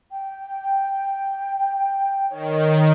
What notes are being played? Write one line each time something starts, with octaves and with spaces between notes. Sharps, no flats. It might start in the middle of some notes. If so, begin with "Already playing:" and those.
G5
D#3 C#5